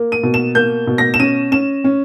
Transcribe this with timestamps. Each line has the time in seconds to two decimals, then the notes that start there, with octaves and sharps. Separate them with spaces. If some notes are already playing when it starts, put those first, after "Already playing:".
Already playing: A#3
0.12 D#7
0.23 B2
0.34 E7
0.55 A#3 G6
0.87 B2
0.98 A#6
1.14 E7
1.20 C#4 D#7
1.52 C#4 E7
1.84 C#4